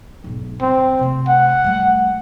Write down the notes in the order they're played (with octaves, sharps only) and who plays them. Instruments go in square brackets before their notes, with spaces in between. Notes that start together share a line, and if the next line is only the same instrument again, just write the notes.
[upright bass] B1 G#2
[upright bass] C2 [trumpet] C4
[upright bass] C3 A3
[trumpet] F#5
[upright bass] G3 A3